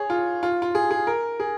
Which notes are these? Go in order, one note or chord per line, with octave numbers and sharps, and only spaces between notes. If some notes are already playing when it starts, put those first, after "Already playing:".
Already playing: G#4 C#5
F4
F4
F4
G#4
G#4
A#4
G#4